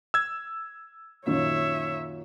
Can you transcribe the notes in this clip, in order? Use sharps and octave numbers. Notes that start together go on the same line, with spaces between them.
E6 G#6
F#2 A#2 D#3 C#5 E5